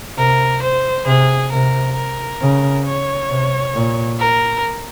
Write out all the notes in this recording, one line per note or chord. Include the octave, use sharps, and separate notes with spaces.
C3 A#4
C5
C3 G#4
C3 A#4
A#4
C#3
C#5
C3
A#2
A#4